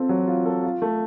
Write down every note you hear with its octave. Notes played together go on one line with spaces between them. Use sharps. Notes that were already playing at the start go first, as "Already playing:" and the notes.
Already playing: C4 F4 A4
F#3
F4
A4
F4
A3